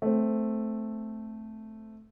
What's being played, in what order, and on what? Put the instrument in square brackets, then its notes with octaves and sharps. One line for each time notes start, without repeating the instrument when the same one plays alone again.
[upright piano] A3 C4